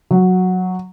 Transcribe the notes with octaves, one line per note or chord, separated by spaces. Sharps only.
F#3